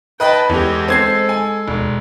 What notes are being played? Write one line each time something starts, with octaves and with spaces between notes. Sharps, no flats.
B4 D#5 G5 A5 B5
E2 G#3 G4 A4
C4 G#6 C7
G#5
E1